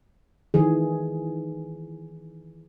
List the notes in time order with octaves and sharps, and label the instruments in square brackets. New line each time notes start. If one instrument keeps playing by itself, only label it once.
[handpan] D#3 E3 G#4